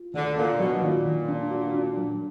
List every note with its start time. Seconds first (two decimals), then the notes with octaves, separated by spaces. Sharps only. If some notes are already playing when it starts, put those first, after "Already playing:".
Already playing: F4
0.14 D2 D3 D#3
0.37 A#2 D4
0.59 B2 F#3
0.82 A#2 D#3
1.05 D#3
1.28 D4
1.51 F#4
1.74 D4
1.97 F#3